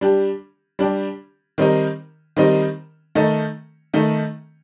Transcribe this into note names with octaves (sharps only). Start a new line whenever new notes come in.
G3 D4 G4
G3 D4 G4
D#3 G3 C4 D#4 A#4
D#3 G3 C4 D#4 A#4
D#3 A3 D#4
D#3 A3 D#4